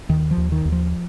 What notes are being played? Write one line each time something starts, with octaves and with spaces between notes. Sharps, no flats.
D#2 D#3
F3
D#2
D#3
D#2
F3